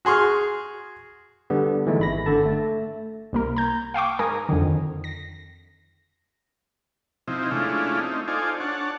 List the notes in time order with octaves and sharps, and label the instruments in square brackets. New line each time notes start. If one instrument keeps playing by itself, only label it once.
[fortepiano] F#4 G#4 C6 C#6 F6
[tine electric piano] D3 G3 B3
E3 G#3 A3 D#4
G#1 B5 A#6
G1 D3 A4 A5
A3
[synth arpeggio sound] C2 A#3 A#4
A#5 G6
F5 G5 C#6 D6
G#2 A#4 G#5 A#5 D#6
F2 D3 D#3
A#6
[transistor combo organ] C3 F3 C4 D#4 E4
G#3 A3 C#4 D4 E4 F4
C4 D#4
D#4 F4 A4 C5 D5 G#5
D4 C#5 F#5 A5